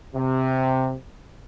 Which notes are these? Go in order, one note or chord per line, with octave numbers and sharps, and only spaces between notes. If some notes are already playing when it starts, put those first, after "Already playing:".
C3